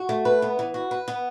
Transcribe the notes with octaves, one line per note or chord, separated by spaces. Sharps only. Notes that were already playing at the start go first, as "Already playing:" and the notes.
Already playing: F#4
A3
B4
B3
E3
F#4
B4
B3